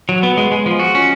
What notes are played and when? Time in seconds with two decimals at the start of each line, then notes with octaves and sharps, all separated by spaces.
0.09 F#3
0.23 B3
0.38 G#3
0.51 G#3
0.66 F3
0.80 F#4
0.95 C#4